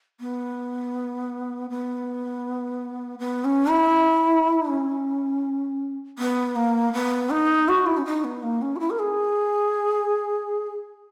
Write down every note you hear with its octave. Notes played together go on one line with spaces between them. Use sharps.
B3
B3
B3
C#4
E4
C#4
B3
A#3
B3
D#4
F#4
E4
C#4
D#4
B3
A#3
C#4
F#4
E4
A#4
G#4